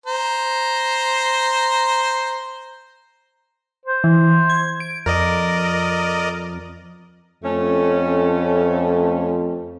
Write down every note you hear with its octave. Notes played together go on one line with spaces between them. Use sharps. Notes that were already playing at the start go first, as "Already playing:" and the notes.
C5 A#5
C5
E3
G#6
D7
F2 A#4 D5 D#5
F2 A3 C#4